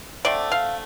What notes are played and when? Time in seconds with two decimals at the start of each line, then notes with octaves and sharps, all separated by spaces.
0.25 D3 A3 C4 D5
0.52 F5